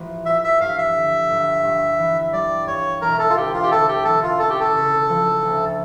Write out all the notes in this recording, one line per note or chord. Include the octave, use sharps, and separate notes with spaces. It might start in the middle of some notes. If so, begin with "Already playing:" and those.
Already playing: A1 A2 F3
F3 E5
E5
G2 F5
E5
D3
G1
G2
E3
G3 D5
G2 C#5
E1 A#4
A4
F4
D2 G4
F4
G4
D3 A4
G4
E1 A4
F4
C#4 A4
G4
A4
C#3
F3
D2